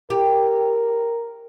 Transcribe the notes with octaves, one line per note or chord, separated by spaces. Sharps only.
G4 A#4